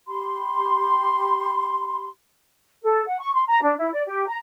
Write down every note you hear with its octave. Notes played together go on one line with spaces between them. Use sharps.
G4 B5 C6
A4
F#5
C#6
C6
A#5
D4
E4
D5
G4
A#5